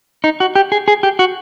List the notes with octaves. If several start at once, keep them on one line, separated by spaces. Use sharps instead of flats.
D#4
F#4
G4
G#4
G#4
G4
F#4